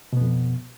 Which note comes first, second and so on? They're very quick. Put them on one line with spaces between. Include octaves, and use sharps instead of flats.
B2 B3 F2